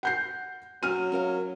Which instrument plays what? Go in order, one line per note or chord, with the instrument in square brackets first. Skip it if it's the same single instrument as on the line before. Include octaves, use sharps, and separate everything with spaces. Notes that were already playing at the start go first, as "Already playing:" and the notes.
[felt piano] F#5 G6 C7
[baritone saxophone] F#3 [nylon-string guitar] C#4 [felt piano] F6 D#7
[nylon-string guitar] C#4 A#4 F5